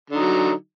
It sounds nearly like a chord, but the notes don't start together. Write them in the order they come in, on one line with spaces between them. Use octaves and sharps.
D3 D#4 F#3